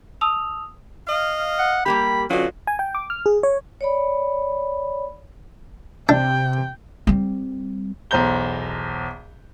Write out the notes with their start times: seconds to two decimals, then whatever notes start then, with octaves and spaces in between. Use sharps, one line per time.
0.21 A5 D#6 E6 F7
1.08 D#5 F5
1.59 F#5
1.86 G3 A#3 G4 B5
2.30 B2 D3 F#3 C#4 F4 F#4
2.67 G#5
2.79 G5
2.95 D6
3.10 F6
3.26 G#4
3.43 C#5
3.81 C#5 D5 B5
6.09 C3 D4 G5
7.07 G3 C4
8.11 B1 E2 C5 A#5 G6 G7